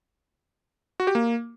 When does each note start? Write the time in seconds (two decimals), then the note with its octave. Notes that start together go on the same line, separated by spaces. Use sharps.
1.00 F#4
1.07 G4
1.15 A#3